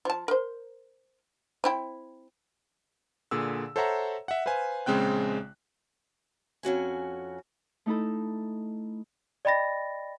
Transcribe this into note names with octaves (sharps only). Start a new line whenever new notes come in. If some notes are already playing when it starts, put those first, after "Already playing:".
F3 A5
A#4 C5
C4 E4 G5
A#2 D3 G#4 E6
A4 C5 C#5 E5 F#5 A#5
E5 F#5
B4 C5 F5 G#5
A#1 C#3 G#3 C4 G5 F#6
F2 C#4 F#4 G#5
A3 D#4 E4 A4
D5 D#5 G5 B5 A6 A#6